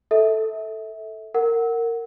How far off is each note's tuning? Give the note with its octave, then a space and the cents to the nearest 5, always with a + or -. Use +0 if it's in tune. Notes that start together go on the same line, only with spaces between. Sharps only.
A4 +0 E5 -25
A#4 -15 F#5 +0